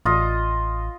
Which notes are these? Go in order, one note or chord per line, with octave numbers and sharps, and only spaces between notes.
A1 F4 D#5